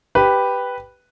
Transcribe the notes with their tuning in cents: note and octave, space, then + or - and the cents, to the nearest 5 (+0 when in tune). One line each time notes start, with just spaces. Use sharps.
G4 +0 B4 +0